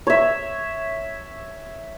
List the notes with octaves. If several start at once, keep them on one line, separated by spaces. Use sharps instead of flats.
C#5 E5